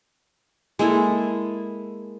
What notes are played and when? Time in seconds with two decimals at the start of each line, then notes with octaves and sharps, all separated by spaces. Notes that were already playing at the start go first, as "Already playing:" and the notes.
0.79 G#3 A#3 E4 A4